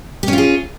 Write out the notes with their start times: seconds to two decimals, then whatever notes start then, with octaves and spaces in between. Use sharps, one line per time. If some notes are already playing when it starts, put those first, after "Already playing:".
0.23 G4
0.28 C#4
0.33 F4
0.38 G#4